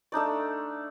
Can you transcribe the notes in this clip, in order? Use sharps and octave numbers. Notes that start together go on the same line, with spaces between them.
A3 D4 D#4 D5